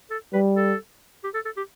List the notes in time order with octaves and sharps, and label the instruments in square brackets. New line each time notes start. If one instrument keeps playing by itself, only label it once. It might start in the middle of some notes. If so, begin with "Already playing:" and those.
[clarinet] A4
[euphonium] G3 [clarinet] B4
[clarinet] A4
G4
A4
A4
G4